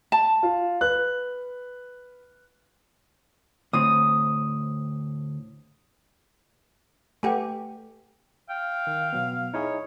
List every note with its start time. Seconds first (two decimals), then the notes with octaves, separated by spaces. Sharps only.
0.12 A5
0.43 F4
0.81 B4 F#6
3.73 D2 A2 C4 D#6
7.23 A3 G4 B4 F#5 G#5
8.49 F5 G5
8.87 D#3
9.13 B2 F#3 B3
9.54 D#4 E4 G#4 C#5